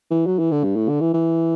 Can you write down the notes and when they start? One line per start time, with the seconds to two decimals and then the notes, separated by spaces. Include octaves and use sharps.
0.11 E3
0.27 F#3
0.39 E3
0.51 D3
0.64 G2
0.76 A2
0.89 D3
1.01 E3
1.14 E3